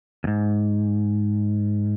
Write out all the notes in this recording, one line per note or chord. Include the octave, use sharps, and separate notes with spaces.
E2 G#2